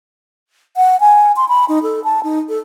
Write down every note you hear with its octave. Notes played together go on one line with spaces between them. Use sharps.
F#5
G#5
C6
B5
D#4
A4
A5
D#4
A4